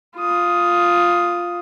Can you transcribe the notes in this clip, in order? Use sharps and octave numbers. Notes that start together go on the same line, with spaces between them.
F4 D#6